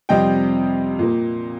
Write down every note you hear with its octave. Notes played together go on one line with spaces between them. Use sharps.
F2 C3 G3 C4 D#5 G5
A#2 A#3